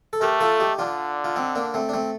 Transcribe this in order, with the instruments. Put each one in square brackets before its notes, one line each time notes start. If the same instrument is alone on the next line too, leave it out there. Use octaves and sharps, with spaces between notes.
[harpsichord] A4
[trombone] A3 [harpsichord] G4 A#4
[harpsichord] F4 A4
D#4 G4
[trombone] D3 [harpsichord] D4 F4
[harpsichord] F4
C4 D#4
A#3 D4
A3 C4
D4
A3 C4